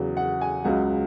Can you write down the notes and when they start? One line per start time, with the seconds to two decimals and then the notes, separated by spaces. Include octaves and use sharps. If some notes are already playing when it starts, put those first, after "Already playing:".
Already playing: E2 C#3 F#3
0.17 F#5
0.41 G#5
0.64 C#2 C#3 F#3 F#5